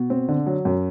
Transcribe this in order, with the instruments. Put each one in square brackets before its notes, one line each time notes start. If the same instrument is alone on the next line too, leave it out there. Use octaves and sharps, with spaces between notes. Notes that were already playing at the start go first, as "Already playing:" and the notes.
Already playing: [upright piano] B2
C4
D3
F#3
F#2